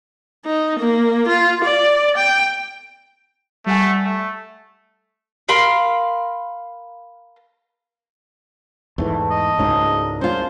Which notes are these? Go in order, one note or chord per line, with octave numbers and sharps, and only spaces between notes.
D#4
A#3
F4
D5
G5
G3 A3 F#5 G#5
A3
A#4 F5 B5 C6
E2 G#2 E3 A3
D#5
C#2 G#2 C#3 F#3 A#3 D4
G#3 C#4 F4 C5